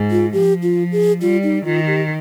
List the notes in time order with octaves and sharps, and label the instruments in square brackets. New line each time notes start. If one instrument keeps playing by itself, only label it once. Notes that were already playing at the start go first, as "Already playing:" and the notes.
Already playing: [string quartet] G#2
[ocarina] F4
[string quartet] F3 [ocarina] G4
[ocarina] F4
G#4
[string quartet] G3 [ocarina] F4
[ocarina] D#4
[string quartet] D#3 [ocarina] F4
[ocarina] G4